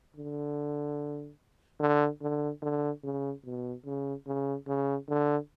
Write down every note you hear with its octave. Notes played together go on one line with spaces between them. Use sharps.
D3
D3
D3
D3
C#3
B2
C#3
C#3
C#3
D3